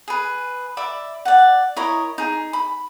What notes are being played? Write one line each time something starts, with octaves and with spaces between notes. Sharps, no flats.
G#4 B4
D5 E5 B5
D5 F#5
E4 A#4 C#5 D#5
D#4 G#4
B5